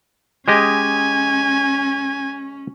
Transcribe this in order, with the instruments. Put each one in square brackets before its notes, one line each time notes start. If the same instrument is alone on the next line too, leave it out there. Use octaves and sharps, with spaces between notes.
[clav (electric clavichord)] G#3 G4 D#5 [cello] C#4 [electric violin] G#5